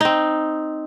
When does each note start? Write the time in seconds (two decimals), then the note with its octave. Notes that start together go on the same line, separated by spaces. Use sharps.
0.01 C4 D#4